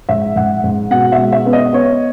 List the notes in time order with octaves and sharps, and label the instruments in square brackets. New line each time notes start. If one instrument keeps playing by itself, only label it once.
[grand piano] G#2 E5
G#2 F#5
G#2
B2 F#5
E5
G#3
E5
B3
D#5
B3 C#5